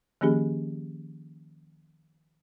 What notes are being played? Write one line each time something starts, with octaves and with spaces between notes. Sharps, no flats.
D#3 F3 A#3 C#4 G4 G#4